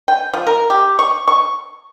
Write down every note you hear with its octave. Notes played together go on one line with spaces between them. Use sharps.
G5
F3
A#4
G4
C#6
C#6